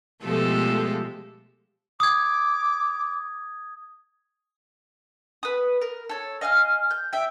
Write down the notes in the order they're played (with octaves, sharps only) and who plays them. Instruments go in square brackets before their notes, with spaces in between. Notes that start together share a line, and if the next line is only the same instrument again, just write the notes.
[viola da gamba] B2 G4 A4 [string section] F3 G#3 A3
[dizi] D6 [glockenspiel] D#6 G#6
[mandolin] B4 D#6
A#4
A4 C#5
D#5 F5 G#5 F6
G6
E5 G5